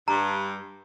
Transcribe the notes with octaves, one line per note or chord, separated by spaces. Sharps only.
G2 A#5